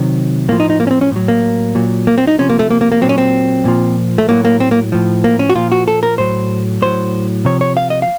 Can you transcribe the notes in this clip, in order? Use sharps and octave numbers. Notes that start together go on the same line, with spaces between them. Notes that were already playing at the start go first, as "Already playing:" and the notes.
Already playing: C3 D#3 F#3
A2 F3 A#3
D#4
D#4
A#3
C#4
C4
C#4
A2 F#3
A#3
A#2 F#3
A#3
C4
D#4
C3 F3 C#4
A#3
A3
A#3
A#3
A#3
A#2 F#3 C4
C#4
C4
A#2 F3
A3
A2 F#3 A#3
A#3
C4
A#3
A2 F3
A#3
C#4
F#4
A#2 F3 F4
F#4
A4
A#4
A2 F#3 C5
A2 F#3 C5
C3 F3 C#5
C#5
F5
D#5
F5